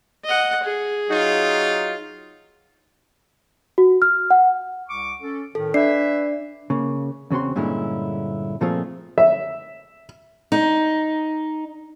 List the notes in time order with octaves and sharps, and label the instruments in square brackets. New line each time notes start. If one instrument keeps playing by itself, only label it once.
[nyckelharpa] D#5 F#5
G#4
[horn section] F#3 D#4 F4
[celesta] F#4
F6
F#5
[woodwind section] C2 C#6 D6
C#4 A4
[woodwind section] A2 D#3 [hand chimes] A4
[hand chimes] D4 D5 C7 [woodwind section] B4 E5
[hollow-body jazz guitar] C#3 A#3
E2 C#3 C4 F#4 C6
G2 A#2 D3 G#3 C#4 E4
A#2 F3 A3 C4 F4 G#4
[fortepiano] E5
[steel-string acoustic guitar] D#4